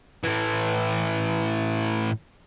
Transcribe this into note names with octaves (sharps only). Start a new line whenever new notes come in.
A2 E3